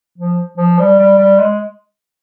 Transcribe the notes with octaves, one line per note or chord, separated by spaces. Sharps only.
F3
F3
G3
G3
G3
G#3